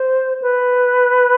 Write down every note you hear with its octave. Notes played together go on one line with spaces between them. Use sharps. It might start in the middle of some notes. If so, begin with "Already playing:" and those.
Already playing: C5
B4